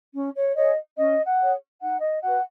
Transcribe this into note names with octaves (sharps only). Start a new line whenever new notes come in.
C#4
C#5
G#4 C#5 D#5
C#4 D#5
F#5
G#4 C#5
D#4 F#5
D#5
F#4 B4 F#5